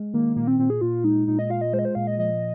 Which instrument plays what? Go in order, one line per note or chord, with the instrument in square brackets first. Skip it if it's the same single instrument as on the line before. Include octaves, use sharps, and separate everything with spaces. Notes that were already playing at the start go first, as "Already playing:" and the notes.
Already playing: [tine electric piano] G#3
[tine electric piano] D#3 [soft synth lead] A#3
[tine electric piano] A#2 [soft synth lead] A#3
[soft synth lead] C4
[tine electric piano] A#2 [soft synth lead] C4
[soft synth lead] G#4
[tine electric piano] A#2 [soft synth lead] F4
[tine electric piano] G#3 [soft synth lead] D#4
[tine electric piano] A#2 [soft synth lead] D#4
[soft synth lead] D#5
[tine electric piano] F4 [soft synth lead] F5
[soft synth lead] D#5
[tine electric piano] G#3 [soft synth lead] C5
[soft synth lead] D#5
C5
[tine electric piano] A#2 [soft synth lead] F5
[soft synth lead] D#5
[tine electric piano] F3 [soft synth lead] D#5